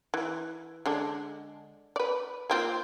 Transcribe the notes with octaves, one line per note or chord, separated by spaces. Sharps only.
E3
D3 G#3 D4
B4 D5
A#3 C4 F4